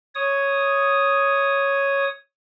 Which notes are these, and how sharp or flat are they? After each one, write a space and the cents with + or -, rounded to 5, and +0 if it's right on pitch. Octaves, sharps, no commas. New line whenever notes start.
C#5 +0 D#6 +0